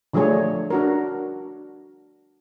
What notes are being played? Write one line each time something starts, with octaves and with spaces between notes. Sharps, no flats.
D3 F3 G3 A3 G#4 C#5
D4 F#4 A#4